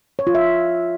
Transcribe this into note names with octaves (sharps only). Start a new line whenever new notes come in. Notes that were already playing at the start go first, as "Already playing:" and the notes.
C#5
F4
E5